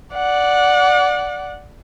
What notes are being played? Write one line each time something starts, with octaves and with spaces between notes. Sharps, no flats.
D5 F#5